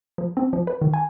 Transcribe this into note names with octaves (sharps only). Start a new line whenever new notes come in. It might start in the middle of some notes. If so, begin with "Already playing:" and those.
F3
C4
F3
B4
D#3
G#5